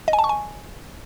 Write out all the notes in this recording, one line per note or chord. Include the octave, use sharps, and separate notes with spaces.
D#5
G#5
A5
C#6
G#5